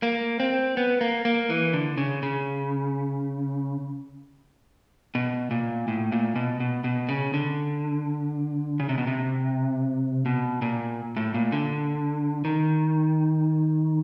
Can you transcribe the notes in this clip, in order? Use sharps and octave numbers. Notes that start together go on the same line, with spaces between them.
A#3
C4
B3
A#3
A#3
E3
D3
C#3
C#3
B2
A#2
A2
A#2
B2
B2
B2
C#3
D3
C#3
C3
B2
C3
B2
A#2
A2
A#2
D3
D#3